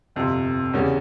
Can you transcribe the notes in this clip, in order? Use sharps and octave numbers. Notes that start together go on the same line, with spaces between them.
G1 F2 C3
E2 C#3 G3 C#4